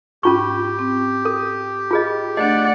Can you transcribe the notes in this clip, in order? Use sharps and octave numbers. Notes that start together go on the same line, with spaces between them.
G#2 C#4 F4 G4 C#6
C4
A4
F4 G#4 D#5
A3 D4 D5 D#5 F#5